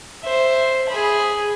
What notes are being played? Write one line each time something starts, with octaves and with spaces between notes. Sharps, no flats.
C5 E5
G#4 B5